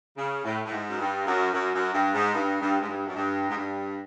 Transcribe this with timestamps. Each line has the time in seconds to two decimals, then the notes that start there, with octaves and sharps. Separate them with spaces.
0.17 C#3
0.44 A2
0.65 A2
0.71 G#2
0.89 F#2
0.98 G2
1.26 F#2
1.53 F#2
1.73 F#2
1.93 G2
2.14 G#2
2.34 G2
2.61 G2
2.81 G#2
2.88 G2
3.07 F#2
3.16 G2
3.49 G#2
3.56 G2